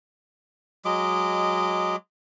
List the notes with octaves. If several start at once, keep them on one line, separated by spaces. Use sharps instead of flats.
F#3 G#3 D#5 D6